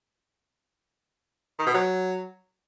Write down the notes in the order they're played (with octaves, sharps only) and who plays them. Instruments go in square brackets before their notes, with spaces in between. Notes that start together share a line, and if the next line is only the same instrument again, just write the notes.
[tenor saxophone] D#3
B2
F#3